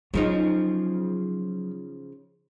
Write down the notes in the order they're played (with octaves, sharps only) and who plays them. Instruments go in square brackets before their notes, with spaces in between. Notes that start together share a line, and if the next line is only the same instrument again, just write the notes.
[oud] C#3 F3 D#4 [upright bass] F#3